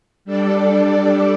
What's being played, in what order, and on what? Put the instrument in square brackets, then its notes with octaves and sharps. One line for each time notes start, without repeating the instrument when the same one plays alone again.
[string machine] G3 D4 A4 D5